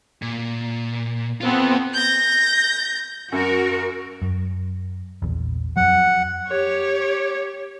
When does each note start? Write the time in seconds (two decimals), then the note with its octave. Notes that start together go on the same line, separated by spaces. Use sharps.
0.22 A#2
1.41 B3 C4 F4 A4
1.92 G6 A#6
3.32 F#2 F#4 A#4
4.22 F#2
5.22 A#1 E2
5.77 F2 F#3 F#5
6.48 G4 C#5